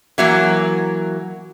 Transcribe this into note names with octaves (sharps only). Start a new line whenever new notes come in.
E3 F#3 A#3